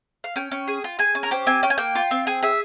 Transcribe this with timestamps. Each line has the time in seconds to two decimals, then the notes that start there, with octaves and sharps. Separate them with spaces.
0.24 F5
0.36 C#4 G5
0.51 C#4
0.68 G#4
0.84 F4
0.99 G#4 G#5
1.15 C#4
1.23 A#4
1.31 G4 C5
1.47 C4 G#5
1.63 C#4 G5
1.70 G#5
1.78 A#3 G5
1.95 F4
2.11 C4
2.27 G#4
2.43 G#4 E5